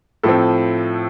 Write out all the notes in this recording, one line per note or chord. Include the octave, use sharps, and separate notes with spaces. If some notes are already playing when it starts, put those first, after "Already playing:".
A2 F3 C4 A4